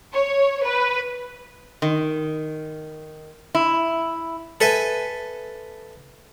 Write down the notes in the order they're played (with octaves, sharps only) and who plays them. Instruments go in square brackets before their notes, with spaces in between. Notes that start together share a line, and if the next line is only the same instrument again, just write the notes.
[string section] C#5
B4
[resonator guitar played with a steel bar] D#3
E4
[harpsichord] A4 B4 E5 G#5